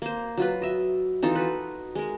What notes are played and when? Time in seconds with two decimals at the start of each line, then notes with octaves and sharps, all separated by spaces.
0.02 A#3 C5
0.37 F#3 F4 B4
0.62 D#5 E5
1.22 E3 D#4 F4 A4
1.35 F#4 B4
1.95 G#3 A#4